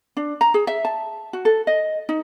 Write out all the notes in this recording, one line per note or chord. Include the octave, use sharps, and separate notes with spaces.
D4
A#5
G#4
E5
A5
F#4
A4
D#5
D#4